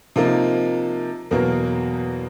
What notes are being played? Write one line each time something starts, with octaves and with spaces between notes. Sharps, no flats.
C3 F3 A#3 D#4
E2 B2 F#3 A#3 A#4